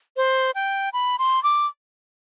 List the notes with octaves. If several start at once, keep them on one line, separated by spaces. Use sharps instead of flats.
C5
G5
B5
C6
D6